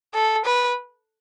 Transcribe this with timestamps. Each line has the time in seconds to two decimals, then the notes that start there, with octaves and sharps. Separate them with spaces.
0.14 A4
0.46 B4